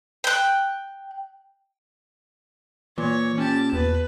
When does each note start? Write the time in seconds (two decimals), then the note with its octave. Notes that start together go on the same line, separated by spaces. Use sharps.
0.24 G5 F#6
2.98 A#2 E3 C#5
3.38 C#4 G4 A5
3.73 E2 B4